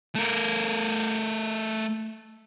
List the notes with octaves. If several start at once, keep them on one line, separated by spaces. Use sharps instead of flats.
A3 A#4